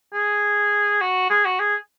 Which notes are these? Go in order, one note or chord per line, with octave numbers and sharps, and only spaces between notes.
G#4
F#4
G#4
F#4
G#4